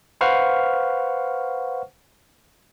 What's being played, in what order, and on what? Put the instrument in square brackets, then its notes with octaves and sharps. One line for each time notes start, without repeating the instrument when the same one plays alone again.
[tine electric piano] B4 C5 F5 F#5 C#6 F6